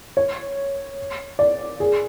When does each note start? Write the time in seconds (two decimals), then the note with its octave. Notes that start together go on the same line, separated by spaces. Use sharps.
0.17 C#5
1.39 D5
1.80 G#4